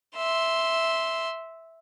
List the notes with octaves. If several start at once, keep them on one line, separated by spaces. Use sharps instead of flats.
E5 C6